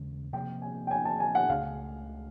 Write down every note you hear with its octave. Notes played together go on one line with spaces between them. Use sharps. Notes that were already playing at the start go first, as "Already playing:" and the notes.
Already playing: D#2 C#3 E3 G#3
C3 F3 A#3 G5
G#5
G5
G#5
A5
G#5
F#5
C#2 C#3 F3 A3 F5